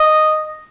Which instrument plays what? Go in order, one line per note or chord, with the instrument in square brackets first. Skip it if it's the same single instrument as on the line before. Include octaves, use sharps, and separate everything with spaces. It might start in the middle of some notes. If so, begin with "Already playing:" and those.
Already playing: [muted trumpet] D#5